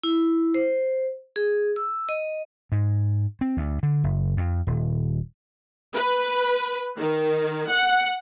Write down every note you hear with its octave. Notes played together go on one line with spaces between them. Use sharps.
E4
C5
G#4
E6
D#5
G#2
C4
D2
D3
F#1
F2
D#1
B4
D#3
F#5